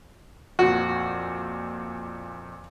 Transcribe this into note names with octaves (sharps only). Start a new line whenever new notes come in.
F2 A#2 F#4